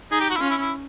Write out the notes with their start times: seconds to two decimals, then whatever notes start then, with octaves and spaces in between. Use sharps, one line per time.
0.11 D#4 G#4
0.21 G4
0.30 F#4
0.37 E4
0.40 C#4 F4
0.50 E4
0.60 E4